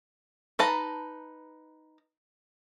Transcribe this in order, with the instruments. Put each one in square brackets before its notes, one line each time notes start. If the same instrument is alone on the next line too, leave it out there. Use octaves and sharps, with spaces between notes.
[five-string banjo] D#4 B4 A5 A#5